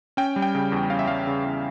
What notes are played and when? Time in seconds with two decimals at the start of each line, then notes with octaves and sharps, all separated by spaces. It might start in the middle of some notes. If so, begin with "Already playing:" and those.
0.17 C#4 G5
0.36 G3
0.42 G5
0.55 C#3
0.72 E2
0.90 C#4 F5
0.99 E5
1.08 G3 F5
1.27 C#3
1.45 E2